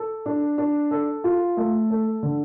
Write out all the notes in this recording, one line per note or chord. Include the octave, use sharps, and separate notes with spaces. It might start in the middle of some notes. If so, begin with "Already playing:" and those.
Already playing: A4
D4
D4
A4
F4
A3
A4
D3